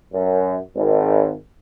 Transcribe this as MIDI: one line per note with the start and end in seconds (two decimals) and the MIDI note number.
0.13 0.58 42
0.76 1.32 32